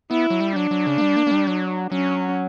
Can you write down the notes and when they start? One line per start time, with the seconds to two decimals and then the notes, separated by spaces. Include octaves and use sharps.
0.11 B3 E4
0.30 F#3
0.41 G3
0.56 F#3 D4
0.71 F#3
0.87 C#3
0.98 A#3
1.01 G3
1.16 A#3
1.27 A#3
1.31 G3
1.47 F#3
1.91 F#3 C#4